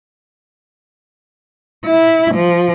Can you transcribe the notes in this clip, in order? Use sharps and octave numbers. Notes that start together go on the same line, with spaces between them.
E4
F3